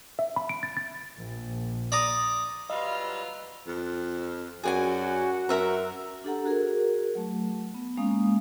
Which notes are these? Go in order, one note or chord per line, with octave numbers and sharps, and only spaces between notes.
E5
B5
D7
A6
A6
A#1
D5 A#5 D#6
F#3 G3 F4 B4 D#5 A#5 E6
F2
F#2 F#4 G#4 D5 G#5
F#2 A#4 E5 A#5
D4 G4 A4 F#5 A#5
F#4 G#4 A#4
F#3 A3
B3
G#3 A#3 C#4 F5 D#6